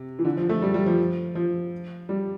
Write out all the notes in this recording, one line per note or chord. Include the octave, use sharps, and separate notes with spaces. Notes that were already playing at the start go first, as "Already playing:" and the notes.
Already playing: C3
E3
D3
F3
A3
G3
G3
F3
F3
G3